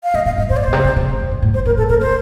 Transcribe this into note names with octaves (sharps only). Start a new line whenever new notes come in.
F5
A2 D#5
A#2 F5
G2 D#5
A2 C5
D5
A#2 C5
C3
D3
C3
A2
F2
G2
A2
A#2 C5
A2 A#4
A2 A4
A2 A#4
A#2 C5